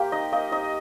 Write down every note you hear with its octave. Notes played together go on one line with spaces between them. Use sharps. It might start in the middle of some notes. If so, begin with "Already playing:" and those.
Already playing: A#3 G4 C5
D#4 D#5
A#3 D#5
D#4 D#5